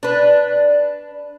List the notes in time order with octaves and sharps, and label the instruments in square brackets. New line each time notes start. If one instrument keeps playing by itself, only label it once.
[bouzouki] D4 B4